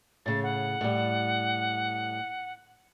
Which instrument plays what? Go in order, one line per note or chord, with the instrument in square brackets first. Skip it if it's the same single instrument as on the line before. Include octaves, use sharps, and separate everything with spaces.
[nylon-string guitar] A2 C#3 [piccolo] A6
[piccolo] F#5
[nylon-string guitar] A2 G3